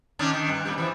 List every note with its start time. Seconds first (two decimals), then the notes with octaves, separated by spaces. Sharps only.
0.19 D#3 C#4 D4
0.34 D#3
0.48 G2
0.65 F2 A#2 G3
0.78 E3 F3